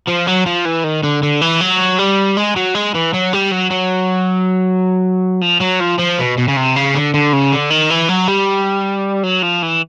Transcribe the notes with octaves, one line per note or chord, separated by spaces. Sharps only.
F3
F#3
F3
E3
D#3
D3
D3
E3
F#3
G3
G#3
F#3
G#3
E3
F#3
G3
F#3
F#3
F3
F#3
F3
F3
B2
B2
C#3
C3
C#3
D3
D3
C#3
D3
D#3
E3
F#3
G3
F#3
F3
E3